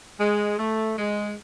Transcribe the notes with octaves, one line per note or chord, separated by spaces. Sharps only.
G#3
A3
G#3